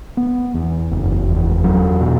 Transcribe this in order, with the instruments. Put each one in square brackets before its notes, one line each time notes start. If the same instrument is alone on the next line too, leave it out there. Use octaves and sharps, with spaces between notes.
[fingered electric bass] B3
E2
F#1
E2
F#3
B2